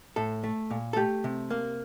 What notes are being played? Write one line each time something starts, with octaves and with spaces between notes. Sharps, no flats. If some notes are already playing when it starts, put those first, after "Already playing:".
A2 A4
A3
A#2
A4
A3 G4
C3
A#3